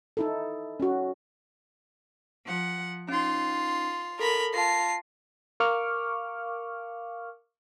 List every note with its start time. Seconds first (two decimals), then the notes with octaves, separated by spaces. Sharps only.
0.17 D#4 E4 A4
0.80 C#4 F#4
2.46 F3 F#5
3.09 C#4 D#4 F4 C6
4.19 A4 A#4 B5
4.54 F4 A5 A#6 C7
5.60 A#4 F5 C#6 D6 F6